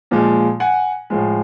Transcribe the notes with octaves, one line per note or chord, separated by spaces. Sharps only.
A#2 F3 G#3
F#5 G#5
A2 F3 G#3